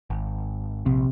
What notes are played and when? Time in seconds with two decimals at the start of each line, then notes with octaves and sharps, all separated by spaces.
0.10 G#1
0.86 A#1 C3